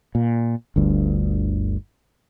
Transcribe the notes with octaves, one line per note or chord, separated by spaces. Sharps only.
A#2
G1 D2 G2